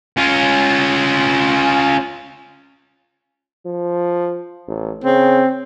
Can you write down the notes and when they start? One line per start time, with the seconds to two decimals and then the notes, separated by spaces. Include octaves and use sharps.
0.17 C#4 F4
3.66 F3
4.68 A1
5.04 C#3 C4